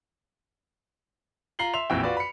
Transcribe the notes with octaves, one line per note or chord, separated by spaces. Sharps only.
F4 A#5 C7 F#7 G7
E5 C6 F7
A#1 F2 E3 F#4 G5
F4 F#4 B4 D5
B5 C#7